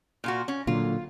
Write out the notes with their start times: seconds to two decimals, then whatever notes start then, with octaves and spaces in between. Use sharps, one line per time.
0.24 A#2 F4 F#4
0.48 C#4
0.67 A#2 D3 F#3 F4